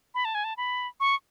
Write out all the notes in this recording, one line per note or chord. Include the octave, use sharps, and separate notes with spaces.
B5
A5
G#5
A5
B5
C#6